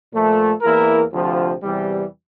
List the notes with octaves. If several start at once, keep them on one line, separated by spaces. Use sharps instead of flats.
A#2 F3 A3
E2 E3 A#3 E4 A#4
D2 C3 F3
E2 C3 E3 G3